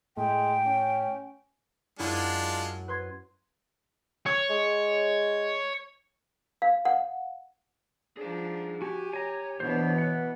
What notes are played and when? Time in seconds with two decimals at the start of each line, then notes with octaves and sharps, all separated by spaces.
0.17 A2 G#3 G5
0.66 C#4
1.99 F#2 G#3 D4 E4 F4 D#7
2.88 B4 C6 G#6
4.26 C#5
4.50 G#3
6.62 F5
6.85 F#5
8.17 F3 D4 G#4 C5
8.82 F#4 G4 G#5
9.13 C#5 G#5 A#5
9.60 B2 E3 B3 D4 C5
9.98 B4 F#5